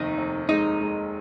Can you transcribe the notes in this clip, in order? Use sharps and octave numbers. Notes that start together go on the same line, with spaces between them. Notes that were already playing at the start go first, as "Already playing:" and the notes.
Already playing: F1 D#2 D#3 D#4
F1
G#3 D#4
G#3